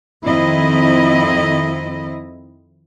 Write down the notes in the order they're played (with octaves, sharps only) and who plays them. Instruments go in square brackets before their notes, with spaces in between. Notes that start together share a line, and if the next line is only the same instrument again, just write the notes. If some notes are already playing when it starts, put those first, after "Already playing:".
[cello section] F2 D#3 C4 E4 D#5